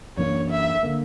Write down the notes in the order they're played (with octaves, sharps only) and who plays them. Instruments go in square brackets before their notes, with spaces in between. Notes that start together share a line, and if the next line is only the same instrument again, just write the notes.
[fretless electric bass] F#2 E3 A#3 D4 [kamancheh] C#5
[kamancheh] E5
[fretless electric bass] D3 A#3